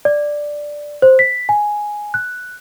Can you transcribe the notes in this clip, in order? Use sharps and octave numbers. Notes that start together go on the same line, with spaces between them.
D5
C5
B6
G#5
F#6